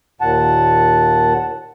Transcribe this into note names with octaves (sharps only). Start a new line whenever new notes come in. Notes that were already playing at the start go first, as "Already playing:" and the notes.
D#2 A#2 F#5 A5